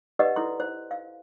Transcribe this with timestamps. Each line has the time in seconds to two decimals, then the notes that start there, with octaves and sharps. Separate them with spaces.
0.19 G4 B4 D5 D#5 F#5
0.36 E4 A4 C6
0.60 C5
0.91 F5